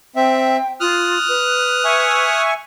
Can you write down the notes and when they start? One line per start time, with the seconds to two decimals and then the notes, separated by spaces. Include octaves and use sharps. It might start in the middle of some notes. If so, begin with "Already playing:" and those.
0.16 C4 E5 G5
0.80 F4 D#6 F6 F#6
1.29 B4
1.85 E5 G#5 C#6